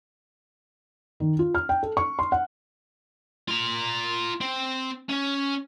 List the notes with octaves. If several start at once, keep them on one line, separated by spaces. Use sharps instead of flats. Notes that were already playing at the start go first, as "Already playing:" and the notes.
D#3
F4
F6
G5
A4
C#6
C6
F#5
F4 A#5
C4
C#4